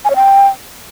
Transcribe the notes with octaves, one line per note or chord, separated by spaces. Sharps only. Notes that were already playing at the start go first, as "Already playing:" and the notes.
G#5
C#5
G5